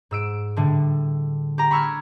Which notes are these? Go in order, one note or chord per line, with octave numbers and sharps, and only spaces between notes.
G#2 E6 D7 E7
A2 D3 G3
G4 A#5
B5 C#6 E6 F6 G#6